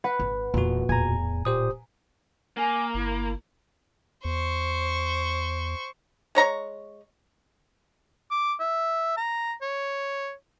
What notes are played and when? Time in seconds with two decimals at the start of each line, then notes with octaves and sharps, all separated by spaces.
0.04 B4 F#5
0.19 G#1
0.54 E1 E2 A#2 F#4
0.89 D1 E2 A2 G#5 A#5
1.45 A#2 G4 C5 D#6
2.57 A#3 G#5
2.94 G1 E4
4.25 E2 C5 C#6
6.35 G#3 C#5 A#5 C#6
8.31 D6
8.60 E5
9.17 A#5
9.62 C#5